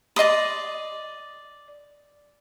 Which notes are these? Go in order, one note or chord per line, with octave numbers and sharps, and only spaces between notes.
D5 D#5 C6 D#6